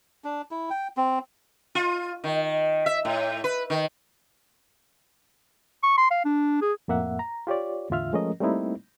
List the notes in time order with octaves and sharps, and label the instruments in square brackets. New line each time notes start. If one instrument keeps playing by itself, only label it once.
[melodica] D4
E4
G5
C4
[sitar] F4
D#3
E5
A2
B4
D#3
[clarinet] C#6
C6
F5
D4
G#4
[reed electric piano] F2 A2 A#3 E5 F#5
A#5
F4 G4 C#5 D5
E2 A2 D3 F4 E5 F6
F3 G#3 A3 C#4 A#4 D#5
G3 A3 A#3 C4 D#4 E4